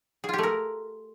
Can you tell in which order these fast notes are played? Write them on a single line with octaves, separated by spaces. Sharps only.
G#4 F4 G4 A3 A#4